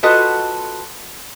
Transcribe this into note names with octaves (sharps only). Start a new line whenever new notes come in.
F4 F#4 A4 B4 D#5